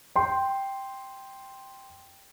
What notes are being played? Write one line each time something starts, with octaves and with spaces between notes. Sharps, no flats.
G5 C6